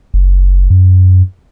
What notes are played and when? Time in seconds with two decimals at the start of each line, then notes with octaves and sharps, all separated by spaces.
0.14 F#1
0.70 F#2